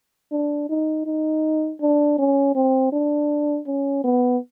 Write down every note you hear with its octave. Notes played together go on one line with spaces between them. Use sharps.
D4
D#4
D#4
D4
C#4
C4
D4
C#4
B3